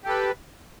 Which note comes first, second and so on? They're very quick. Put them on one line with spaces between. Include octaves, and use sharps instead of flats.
G4 A4 B4